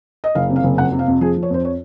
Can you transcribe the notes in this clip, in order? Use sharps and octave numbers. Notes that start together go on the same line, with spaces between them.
D#5
F#1 F5
C3
F5
F#1
F2 F#5
C3
F5
F2
F3 G#4
F3
C#5
F2 C5
C#5